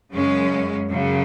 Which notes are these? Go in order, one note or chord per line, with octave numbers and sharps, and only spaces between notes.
F#2 C#3 G#3 C#4
F#2 C#3 F#3